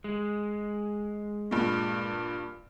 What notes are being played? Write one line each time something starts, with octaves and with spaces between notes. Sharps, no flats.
G#3
G2 A#2